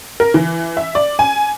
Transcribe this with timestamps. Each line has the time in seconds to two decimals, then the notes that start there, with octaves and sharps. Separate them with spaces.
0.20 A#4
0.34 E3
0.77 E5
0.95 D5
1.19 G#5